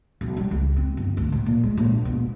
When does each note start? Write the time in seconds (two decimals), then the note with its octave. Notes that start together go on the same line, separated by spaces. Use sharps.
0.21 B1
0.37 G3
0.51 C#2
0.77 C4
0.97 G1
1.17 D2
1.32 A2
1.46 A#2
1.63 G#3
1.77 A#1
2.05 B2